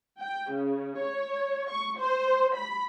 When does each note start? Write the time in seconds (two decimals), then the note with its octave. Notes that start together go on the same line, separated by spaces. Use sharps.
0.20 G5
0.52 C#3
0.99 C#5
1.70 C#6
1.99 C5
2.55 B5